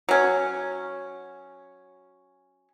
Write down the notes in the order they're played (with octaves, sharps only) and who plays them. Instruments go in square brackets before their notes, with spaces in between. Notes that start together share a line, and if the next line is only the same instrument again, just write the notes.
[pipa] F#3 C#4